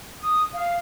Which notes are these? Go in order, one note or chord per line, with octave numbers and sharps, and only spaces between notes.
D#6
F5